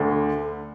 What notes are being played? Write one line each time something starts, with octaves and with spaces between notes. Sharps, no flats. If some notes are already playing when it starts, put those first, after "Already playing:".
Already playing: D2 D3